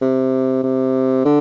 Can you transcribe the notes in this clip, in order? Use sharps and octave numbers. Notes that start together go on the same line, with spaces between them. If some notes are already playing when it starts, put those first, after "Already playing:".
C3
C3
D3